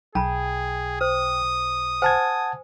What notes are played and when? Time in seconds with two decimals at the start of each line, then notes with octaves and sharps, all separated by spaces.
0.15 B1 G#4 G5 A5 B5
1.01 C5 D#6
2.02 C5 F#5 G#5 A5 G#6